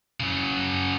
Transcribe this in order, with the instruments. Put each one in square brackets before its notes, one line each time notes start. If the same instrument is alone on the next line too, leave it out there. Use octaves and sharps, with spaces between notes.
[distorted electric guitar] C#3 F#3